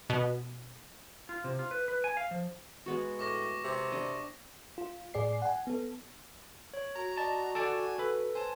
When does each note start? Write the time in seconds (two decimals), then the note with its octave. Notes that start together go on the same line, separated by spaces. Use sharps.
0.10 B2
1.29 F4
1.44 C3
1.59 F4
1.71 B4
1.88 B4
2.04 G#5
2.17 F5
2.31 F3
2.86 G#3 B3 F#4
3.19 A2 C#6 D6 A#6
3.64 C3
3.92 D4 D#5
4.78 F4
5.14 A2 G#4 D5 C7
5.42 F#5 G#5
5.67 B3 A4
6.74 C#5
6.96 F#4 A#5
7.17 D5 D#5 A5
7.55 A4 D5 G#5 A5
7.99 A4 B4
8.35 C5 G#5 A5